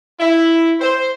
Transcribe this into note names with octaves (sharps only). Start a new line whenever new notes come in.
E4
C5